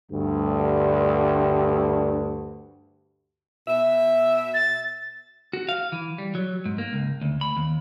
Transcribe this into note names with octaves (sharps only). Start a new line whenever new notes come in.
D2 G2
B2 E5
A6
F#4
F5
E3
G3
F#3
G#2
A#3
C#2
D2
B5
D#2